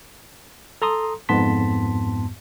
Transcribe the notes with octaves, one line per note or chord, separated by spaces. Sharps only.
A4 A#5 C6 D#6
F2 G#2 B3 A5 C6 B6